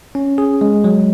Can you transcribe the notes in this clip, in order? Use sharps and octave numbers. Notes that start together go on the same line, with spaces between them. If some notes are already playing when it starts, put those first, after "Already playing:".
C#4
G#4
G#3
F#3